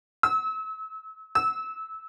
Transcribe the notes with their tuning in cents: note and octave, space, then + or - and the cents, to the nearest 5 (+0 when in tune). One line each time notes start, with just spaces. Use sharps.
E6 -35
E6 -25